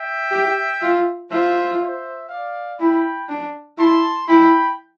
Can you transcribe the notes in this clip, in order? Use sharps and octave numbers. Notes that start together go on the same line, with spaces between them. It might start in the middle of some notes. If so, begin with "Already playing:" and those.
Already playing: E5 G5
G4
F4
F4 C5 E5
C5 E5
D5 F5
E4 G5 B5
D4
E4 A5 C6
E4 G5 B5